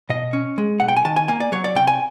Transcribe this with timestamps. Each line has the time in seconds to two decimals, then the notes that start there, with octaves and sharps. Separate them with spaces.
0.09 B2 D#5
0.33 C#4
0.58 G#3
0.80 B1 F#5
0.88 G5
0.96 G#5
1.05 D#3 A5
1.16 G#5
1.28 A#3 G#5
1.40 D5
1.52 F#3 C#5
1.64 D5
1.75 C3 G5
1.87 G#5